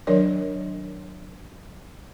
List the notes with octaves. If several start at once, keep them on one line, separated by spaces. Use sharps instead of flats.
D#3 F#3 D4 A#4 C#5 D5